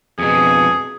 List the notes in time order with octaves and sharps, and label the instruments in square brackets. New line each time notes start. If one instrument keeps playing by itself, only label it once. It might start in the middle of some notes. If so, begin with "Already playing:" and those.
[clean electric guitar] F2 B2 [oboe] G#4